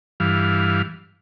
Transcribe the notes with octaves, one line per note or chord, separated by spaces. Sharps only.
G2 E3 F5